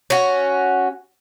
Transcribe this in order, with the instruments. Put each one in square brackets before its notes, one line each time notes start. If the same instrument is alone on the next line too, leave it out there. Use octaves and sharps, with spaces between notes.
[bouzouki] C#4 F#4